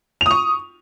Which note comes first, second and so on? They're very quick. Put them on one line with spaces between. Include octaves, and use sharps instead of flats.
F7 D#6 C#6